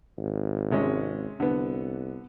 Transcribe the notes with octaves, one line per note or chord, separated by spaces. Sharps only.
G#1
C3 G#3 C#4
C2 D3 B3